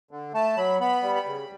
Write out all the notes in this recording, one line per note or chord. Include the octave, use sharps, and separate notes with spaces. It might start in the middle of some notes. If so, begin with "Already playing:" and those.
D3
A3 A5
F#3 B5
B3 B5
G3
B5
C#3